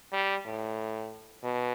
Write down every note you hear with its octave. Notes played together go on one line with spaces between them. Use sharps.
G3
A2
B2